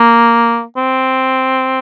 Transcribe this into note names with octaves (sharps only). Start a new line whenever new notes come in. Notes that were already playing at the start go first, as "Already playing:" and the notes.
Already playing: A#3
C4